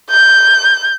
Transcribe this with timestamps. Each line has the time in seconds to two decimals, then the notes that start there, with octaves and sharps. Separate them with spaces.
0.11 G6